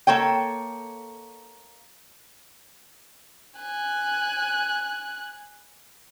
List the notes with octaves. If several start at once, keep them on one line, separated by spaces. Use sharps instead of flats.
A#3 A4 C#5 G5
G#5 F#6